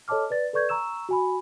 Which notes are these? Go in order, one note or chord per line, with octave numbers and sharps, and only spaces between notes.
A4 C#5 D#5 A5 D6 F6
B4 D5 A6
A4 B4 D5 C#6 G6 G#6
A#5 C#6 E6 E7
F#4 G#5 B5